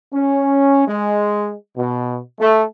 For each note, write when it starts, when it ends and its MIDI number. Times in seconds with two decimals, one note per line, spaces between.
0.12 0.86 61
0.87 1.53 56
1.76 2.18 47
2.39 2.63 57